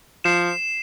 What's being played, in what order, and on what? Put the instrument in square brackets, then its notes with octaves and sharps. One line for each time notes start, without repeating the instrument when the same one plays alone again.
[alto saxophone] F3 [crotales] C7 E7